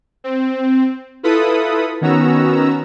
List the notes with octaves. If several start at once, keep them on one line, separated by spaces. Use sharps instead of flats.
C4
E4 F4 A4 B4 B5 D#6
D#3 B3 C#4 F#4 A#5 E6